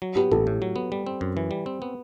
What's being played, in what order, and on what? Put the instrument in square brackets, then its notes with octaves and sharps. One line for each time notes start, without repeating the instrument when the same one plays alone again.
[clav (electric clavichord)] F#3
[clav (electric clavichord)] B3 [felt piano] G4
[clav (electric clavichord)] A1 [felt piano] A4
[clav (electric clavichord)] A2
F#3
B3
G3
C4
F#2
E3
G3
C4
B3